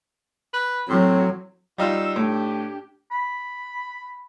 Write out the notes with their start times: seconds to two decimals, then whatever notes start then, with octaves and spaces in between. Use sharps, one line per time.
0.54 B4
0.89 A2 F#3 C4
1.78 G3 D#4 F4 F#4 E6
2.16 A2 D4 G4
3.11 B5